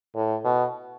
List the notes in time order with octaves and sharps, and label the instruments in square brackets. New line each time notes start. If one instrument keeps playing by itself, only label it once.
[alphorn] A2
B2